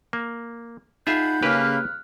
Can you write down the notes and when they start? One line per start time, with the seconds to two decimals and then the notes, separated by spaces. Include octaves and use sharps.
0.13 A#3
1.07 D#4 F4 G#4 E5 F#5 B5 G6
1.43 C#3 A#3 G4 B4 B5 F6 F#6